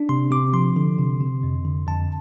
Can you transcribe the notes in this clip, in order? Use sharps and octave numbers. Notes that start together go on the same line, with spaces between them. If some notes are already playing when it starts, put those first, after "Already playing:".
Already playing: D4
C3 C6
C3 D6
F3 C6
D3
C3
C3
F2
D3
F2 A5